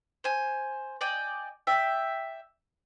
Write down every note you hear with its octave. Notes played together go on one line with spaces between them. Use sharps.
C5 G#5
D5 D#5 G5 G#5
D5 E5 G5